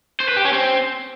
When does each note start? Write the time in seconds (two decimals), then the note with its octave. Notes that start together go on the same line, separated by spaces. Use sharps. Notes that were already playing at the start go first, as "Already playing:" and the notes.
0.20 C5
0.28 B4
0.37 G4
0.45 C#4
0.53 C4